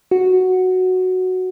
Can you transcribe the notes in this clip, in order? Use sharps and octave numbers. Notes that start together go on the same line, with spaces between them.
F#4